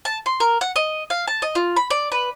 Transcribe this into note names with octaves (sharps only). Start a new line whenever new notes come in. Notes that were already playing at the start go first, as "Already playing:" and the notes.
A5
C6
A#4
F#5
D#5
F5
A5
D#5
F4
B5
D5
B4